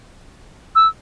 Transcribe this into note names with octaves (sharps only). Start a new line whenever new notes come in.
E6